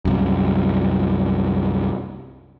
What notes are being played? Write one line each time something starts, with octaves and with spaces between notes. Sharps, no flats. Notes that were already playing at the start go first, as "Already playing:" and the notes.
C2 F#2